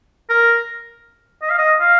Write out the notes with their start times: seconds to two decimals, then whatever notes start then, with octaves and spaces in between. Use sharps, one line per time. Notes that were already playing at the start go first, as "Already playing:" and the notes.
0.30 A#4
1.42 D#5
1.50 F5
1.58 D#5
1.80 F5